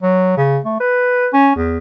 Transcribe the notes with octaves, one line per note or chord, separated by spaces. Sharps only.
F#3
C#3
A3
B4
C#4
E2